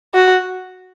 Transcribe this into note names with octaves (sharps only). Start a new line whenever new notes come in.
F#4